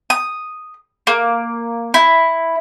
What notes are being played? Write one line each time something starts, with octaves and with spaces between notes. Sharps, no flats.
D#6
A#3
E4